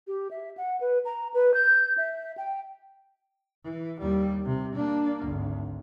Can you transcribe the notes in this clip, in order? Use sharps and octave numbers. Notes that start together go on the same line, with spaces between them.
G4
E5
F#5
B4
A#5
B4
G6
E5
G5
E3
D#2 G3
C3
A#3 D4
G#1 D2